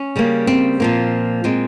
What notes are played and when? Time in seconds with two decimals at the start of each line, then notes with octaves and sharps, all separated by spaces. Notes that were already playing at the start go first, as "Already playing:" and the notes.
Already playing: C#4
0.16 C#3 G3 A#3
0.47 C4
0.80 A#2 F3 A#3
1.44 A#2 G#3 C4